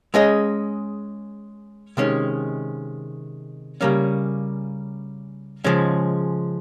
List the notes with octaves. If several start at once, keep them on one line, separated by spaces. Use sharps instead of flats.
G#3 C#4 G#4 D#5
C3 D#3 G#3 C#4
C#3 G3 A#3 C#4
C#3 F3 G#3 C#4